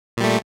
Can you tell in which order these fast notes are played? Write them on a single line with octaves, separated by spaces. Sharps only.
A#2 G3 A3